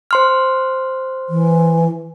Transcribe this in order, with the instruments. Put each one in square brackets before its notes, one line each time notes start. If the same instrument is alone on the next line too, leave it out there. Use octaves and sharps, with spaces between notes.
[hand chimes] C5 C6 F6
[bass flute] E3